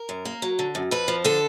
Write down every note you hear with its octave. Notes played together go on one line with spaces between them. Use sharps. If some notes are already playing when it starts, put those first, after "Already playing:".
Already playing: A#4
F#2
A#3
F#3
D3
F#2
F2 B4
F3
D3 A4